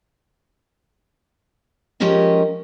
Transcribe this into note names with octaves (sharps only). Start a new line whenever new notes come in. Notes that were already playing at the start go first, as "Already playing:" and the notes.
F3 G#3 C#4 G4 A#4 D#5